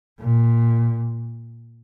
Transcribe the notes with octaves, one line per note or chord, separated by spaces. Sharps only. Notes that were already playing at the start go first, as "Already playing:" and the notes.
A#2